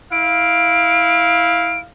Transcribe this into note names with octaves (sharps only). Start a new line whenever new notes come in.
E4 F5 D7